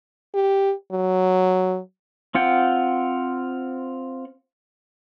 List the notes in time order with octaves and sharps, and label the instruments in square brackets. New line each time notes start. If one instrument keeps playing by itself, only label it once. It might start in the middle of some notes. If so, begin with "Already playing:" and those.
[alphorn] G4
F#3
[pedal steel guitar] C4 F4 F#5 G5